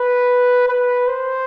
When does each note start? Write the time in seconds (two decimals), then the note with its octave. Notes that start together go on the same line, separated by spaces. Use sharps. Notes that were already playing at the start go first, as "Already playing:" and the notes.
Already playing: B4
0.68 B4
1.08 C5